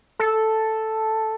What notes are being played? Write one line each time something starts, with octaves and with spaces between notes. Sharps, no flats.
A4